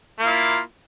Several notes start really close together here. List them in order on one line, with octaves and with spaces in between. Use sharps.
A#3 F4 E4